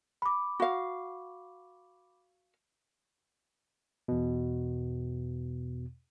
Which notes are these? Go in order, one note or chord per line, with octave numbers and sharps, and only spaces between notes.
B5 D6
F#4 F5
E2 B2